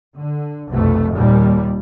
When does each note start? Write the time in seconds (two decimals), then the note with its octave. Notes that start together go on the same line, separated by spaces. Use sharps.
0.17 D3
0.70 F1 B1 F2 A3
1.14 D#2 A#2 G3